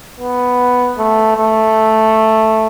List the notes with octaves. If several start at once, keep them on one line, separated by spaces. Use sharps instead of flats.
B3
A3
A3